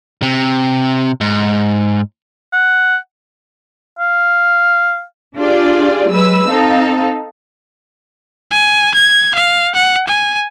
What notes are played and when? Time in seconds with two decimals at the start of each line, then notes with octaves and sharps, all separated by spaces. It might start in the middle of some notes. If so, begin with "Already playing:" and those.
0.22 C3
1.21 G#2
2.53 F#5
3.99 F5
5.37 D4 F4 G4 G#4 D5
6.10 F#3 G#3 B4 E6
6.49 C4 D#4 A4 F5
8.51 G#5
8.94 G#6
9.35 F5
9.75 F#5
10.08 G#5